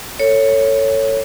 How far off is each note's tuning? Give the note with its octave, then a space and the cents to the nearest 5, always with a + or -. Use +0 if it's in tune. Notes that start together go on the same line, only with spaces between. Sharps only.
A4 +25 C#5 +0